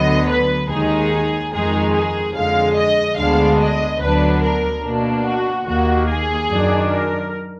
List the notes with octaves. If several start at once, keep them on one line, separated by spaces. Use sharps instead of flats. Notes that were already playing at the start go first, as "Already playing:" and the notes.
Already playing: D2 D3 F#3 B3 D#5
B4
D#2 D#3 G#3 D#4 G#4
F2 D#3 G#3 D#4 G#4
G#4
F2 D3 G#3 F5
D#5
D2 D3 G#3 B3 D4 F5
D#5
D2 D3 F#3 B3 D4 B4
A#4
B2 A#3 D4
F#4
D#2 D#3 A#3 F#4
G#4
F#2 D#3 F#3 D4
A#4